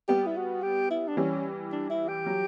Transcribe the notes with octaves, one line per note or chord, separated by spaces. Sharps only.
G3 B3 G4
E4
F#4
G4
E4
D4
E3 G3 C#4
D4
E4
G4
F#3